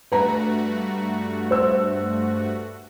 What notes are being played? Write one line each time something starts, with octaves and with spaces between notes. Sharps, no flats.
G2 A3 F#4 B4 A#5
C5 E6